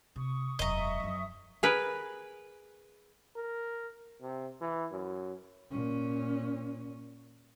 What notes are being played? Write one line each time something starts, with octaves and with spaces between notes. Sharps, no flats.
C3 C#6 D#6
E1 F#2 D#5 E5 A#5 C#6 D#6
F#2 F3
G#4 A#4 B4
A#4
C3
E3
F#2
A#2 C#4